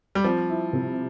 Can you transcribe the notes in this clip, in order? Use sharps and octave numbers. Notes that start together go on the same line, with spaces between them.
G3
F3 C4
E4
C3